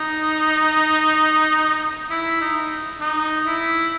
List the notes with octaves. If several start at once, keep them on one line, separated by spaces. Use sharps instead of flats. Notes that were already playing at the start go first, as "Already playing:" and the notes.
Already playing: D#4
E4
D#4
D#4
E4